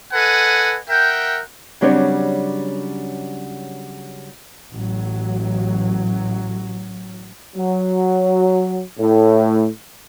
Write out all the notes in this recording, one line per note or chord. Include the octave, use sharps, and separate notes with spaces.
A4 B4 D#5 F#5 G#5
A#4 E5 F#5 G5
C#3 F#3 G3 C4 D4 C#5
A1 F#3
F#3
A2